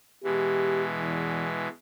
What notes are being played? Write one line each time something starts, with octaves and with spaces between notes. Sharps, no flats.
B2 E3 G#3 G4
E2